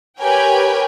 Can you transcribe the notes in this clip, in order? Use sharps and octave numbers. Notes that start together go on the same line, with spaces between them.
G4 A#4 B4 C#5 G5 G#5